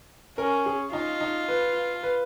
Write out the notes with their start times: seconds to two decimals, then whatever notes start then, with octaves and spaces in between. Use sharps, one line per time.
0.38 C#4 A#4
0.66 G#4
0.93 D#4 F4
1.21 D#4
1.48 B4
2.03 B4